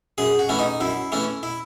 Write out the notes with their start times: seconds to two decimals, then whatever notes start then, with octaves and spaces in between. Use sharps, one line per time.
0.18 F#2 G#4
0.39 F#4
0.49 E3 A3 C#4
0.59 D#4
0.80 F#2 E4
1.12 E3 A3 C#4
1.43 E4